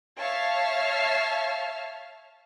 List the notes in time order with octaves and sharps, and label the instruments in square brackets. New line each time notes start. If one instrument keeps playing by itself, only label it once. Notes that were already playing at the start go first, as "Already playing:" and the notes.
[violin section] C#5 E5 F5 A5